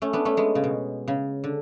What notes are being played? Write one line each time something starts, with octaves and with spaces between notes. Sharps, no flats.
A3 C#4
B3 D4
A3 C#4
G#3 B3
C#3
B2
C#3
D3